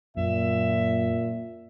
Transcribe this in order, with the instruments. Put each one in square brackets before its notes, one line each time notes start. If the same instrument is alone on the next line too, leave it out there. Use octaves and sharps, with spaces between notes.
[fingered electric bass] F#2 [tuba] A#2 [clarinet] E5